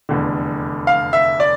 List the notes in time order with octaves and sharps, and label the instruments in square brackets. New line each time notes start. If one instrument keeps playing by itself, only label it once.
[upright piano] F1 E2 D3
F5
E5
D5